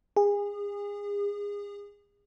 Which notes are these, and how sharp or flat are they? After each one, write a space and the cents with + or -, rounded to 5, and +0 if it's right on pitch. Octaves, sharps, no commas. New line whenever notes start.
G#4 -30